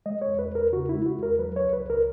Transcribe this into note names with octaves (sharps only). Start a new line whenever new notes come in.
G#3 D#5
C#5
E2
B4
E2 A#4
C#3 F#4
E4
G#3
F#4
E2 A#4
F#3 B4
C#5
C#2
B4
C#2
A#4